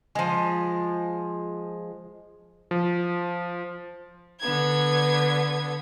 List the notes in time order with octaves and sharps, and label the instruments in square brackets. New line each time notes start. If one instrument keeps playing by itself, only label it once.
[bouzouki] F3 G#3
[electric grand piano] F3
[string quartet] D3 B3 G#6